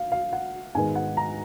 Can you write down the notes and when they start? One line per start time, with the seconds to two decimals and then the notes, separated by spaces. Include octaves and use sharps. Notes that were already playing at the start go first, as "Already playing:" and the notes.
Already playing: F5
0.12 F5
0.33 F#5
0.75 G#2 D#3 G#3 B3 G#5
0.95 F#5
1.17 A#5